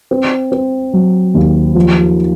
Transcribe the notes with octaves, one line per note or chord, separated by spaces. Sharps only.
C4
C4
F#3
D#2
F3